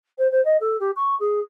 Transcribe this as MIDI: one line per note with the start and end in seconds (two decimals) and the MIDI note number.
0.18 0.30 72
0.31 0.43 72
0.45 0.57 75
0.60 0.77 69
0.80 0.91 67
0.96 1.15 85
1.20 1.40 68